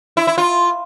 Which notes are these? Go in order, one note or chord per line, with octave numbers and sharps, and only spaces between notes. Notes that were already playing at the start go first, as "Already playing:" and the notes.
E4
E4
F4